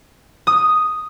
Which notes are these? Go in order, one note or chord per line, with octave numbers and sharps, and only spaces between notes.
D#6